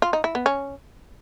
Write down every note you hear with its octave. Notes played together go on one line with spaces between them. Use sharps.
F4
D#4
E4
B3
C#4